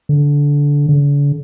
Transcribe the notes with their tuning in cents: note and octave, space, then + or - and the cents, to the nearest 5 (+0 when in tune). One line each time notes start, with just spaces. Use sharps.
D3 -20
D3 -45